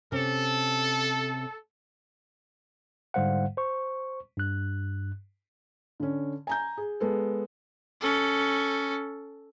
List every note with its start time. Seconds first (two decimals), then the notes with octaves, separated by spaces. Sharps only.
0.12 C3 C#4 A4
3.14 G#2 D3 G3 C5 F5 F#5
3.57 C5 C#6
4.37 G2 F#6
6.00 D3 C#4
6.47 G#5 A#5 G6
6.77 G#4
7.00 G#3 B3 A4
8.01 C#4 A4